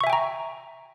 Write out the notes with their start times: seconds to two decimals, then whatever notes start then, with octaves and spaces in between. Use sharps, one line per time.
0.01 C#6
0.04 E5
0.07 G#5
0.10 G5
0.13 A#5